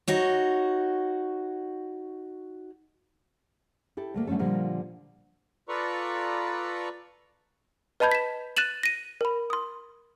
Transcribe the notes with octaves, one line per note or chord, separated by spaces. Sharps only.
D#4 F#4 C#5
E4 G4 A4
D2 A3 A#3
D3 F#3 A3 C#4 A4
A#2 D3 F3 G3 A#3 A#4
F4 A4 B4 D5 A#5 C#6
B4 D#5 A5 B5 G6 G#6
B6 E7
F#6 A6 D#7 E7 F#7
A#6 D#7
A#4 B5
C6 D#6